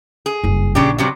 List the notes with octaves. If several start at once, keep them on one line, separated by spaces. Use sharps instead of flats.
G#4
F#1 G2
A#1 C#3 D4 G4
G2 C3 F#3